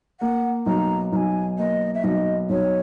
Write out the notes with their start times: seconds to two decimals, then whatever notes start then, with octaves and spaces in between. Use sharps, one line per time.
0.20 A#3 F#5
0.66 B1 A#5
1.12 B1 A#5
1.17 G#5
1.58 A#3 D#5
1.94 E5
2.04 B1 D#5
2.50 B1 C#5